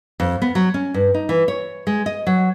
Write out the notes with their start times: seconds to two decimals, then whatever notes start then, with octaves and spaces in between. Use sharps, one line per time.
0.20 F2
0.42 B3
0.55 F#3
0.74 C#4
0.94 G2
1.14 D#4
1.29 E3
1.48 C#5
1.87 G#3
2.06 D#5
2.27 F#3